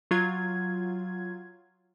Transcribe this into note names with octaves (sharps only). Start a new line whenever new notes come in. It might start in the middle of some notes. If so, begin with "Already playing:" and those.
F#3 F4 G#6